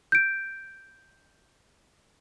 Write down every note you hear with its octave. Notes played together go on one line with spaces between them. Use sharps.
G6 D7